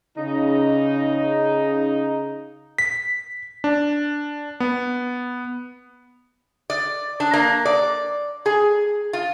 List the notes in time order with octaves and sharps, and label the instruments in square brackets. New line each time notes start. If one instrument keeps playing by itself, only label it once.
[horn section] C#3 D#4
[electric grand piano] B6
D4
B3
[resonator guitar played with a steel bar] D5
D4
A#3
D5
G#4
F4